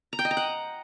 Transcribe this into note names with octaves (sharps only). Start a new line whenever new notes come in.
A#5
G5
D#5
A#5
F#5